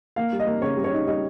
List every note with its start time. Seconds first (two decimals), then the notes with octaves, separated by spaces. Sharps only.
0.16 A#3 F5
0.33 G3
0.39 D#5
0.47 A#3
0.62 C#3 C#5
0.77 G3
0.84 C#5
0.93 D#4
1.07 G3 D#5